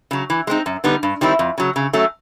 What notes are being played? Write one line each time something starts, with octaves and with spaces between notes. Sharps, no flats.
C#3 F#3
E3
G#3 C4 D#4
F#2
D3 G3 B3 D#4
G2
D#3 G3 C4 E4
F2
C#3 F#3
C#3
F#3 A3 C#4